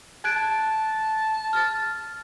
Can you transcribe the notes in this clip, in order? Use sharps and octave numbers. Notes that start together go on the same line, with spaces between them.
A5 F#6 G#6 D7
F6 A6